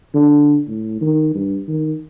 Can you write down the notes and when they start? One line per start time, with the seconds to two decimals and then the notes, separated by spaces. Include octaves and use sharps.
0.14 D3
0.67 A2
1.01 D#3
1.35 G2
1.68 D#3